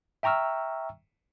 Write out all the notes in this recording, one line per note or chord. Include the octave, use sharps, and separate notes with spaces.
E5 G5 A#5 C#6 E6 F6